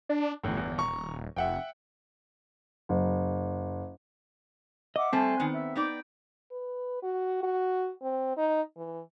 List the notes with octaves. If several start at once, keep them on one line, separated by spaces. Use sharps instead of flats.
D4
G1 E2 A2
E2
D#1 A#5 C#6
F1 E5 F#5 G5
F#1
D#5 E5 F#5 D6
G3 A3 C4 A4 C5 G#5
D#3 B3
E5
B3 D#4 D5 G5
B4
F#4
F#4
C4
D#4
E3